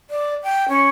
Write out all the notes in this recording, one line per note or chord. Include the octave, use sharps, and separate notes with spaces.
D5
G5
C#4